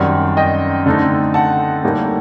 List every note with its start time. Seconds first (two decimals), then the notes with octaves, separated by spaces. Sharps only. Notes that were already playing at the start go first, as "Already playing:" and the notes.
Already playing: F#2 D#3 G3 C4 D5 F#5
0.37 D#5 G5
0.86 D3 A3 C4 D#4
1.34 F#5 A5
1.83 A2 G3 A#3 D#4